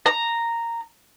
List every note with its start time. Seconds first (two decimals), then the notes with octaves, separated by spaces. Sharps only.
0.06 A#5